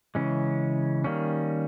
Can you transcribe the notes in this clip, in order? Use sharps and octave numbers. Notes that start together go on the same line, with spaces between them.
C#3 E3 G#3 C#4
D#3 G3 A#3 C#4